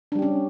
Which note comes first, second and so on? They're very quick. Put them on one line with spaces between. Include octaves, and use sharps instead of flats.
D4 G3 G4 C#4